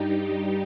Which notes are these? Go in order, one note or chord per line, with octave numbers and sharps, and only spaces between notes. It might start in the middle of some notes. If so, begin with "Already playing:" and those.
Already playing: G2 G3 D#4 G4